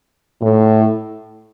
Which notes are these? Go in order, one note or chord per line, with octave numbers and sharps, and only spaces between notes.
A2